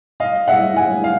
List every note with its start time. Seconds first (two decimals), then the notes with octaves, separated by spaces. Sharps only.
0.20 D#5 F5
0.48 E5 F#5
0.76 F#5 G#5
1.04 F5